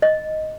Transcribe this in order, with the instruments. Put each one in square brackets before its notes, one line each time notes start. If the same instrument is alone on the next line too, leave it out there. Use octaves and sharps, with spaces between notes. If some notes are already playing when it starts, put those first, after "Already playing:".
[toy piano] D#5